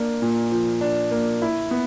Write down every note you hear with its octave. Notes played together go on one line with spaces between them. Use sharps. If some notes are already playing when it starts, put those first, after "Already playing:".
Already playing: A#3 D4
A#2
F3
D4
A#3
E4
B3